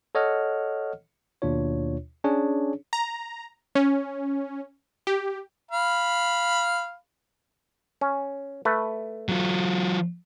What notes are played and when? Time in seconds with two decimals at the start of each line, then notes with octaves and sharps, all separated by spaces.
0.15 A4 C#5 D#5 F#5 F6
1.42 D#2 B2 D4 F4 C#5
2.24 C#4 D4 G#4 C#5
2.93 A#5
3.75 C#4
5.07 G4
5.71 F5 B5
8.01 C#4
8.65 A3 B4
9.29 F#3 F4